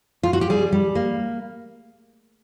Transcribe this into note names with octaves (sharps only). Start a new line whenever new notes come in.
F4
F#4
G4
G3 G#4
G3
A#3